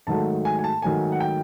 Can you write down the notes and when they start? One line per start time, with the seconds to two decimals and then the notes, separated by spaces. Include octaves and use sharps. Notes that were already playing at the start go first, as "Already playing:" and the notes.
0.07 G#2 D#3 F#3 A3 A5
0.45 G#5
0.59 G#5
0.64 A5
0.82 G#2 D#3 F#3 A3 G#5
1.12 F#5
1.20 G5